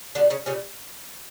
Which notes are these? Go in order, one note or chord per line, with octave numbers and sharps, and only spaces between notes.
B2 D3 G3 D4
C#3 C#4
A#2 C#3 G3 C#4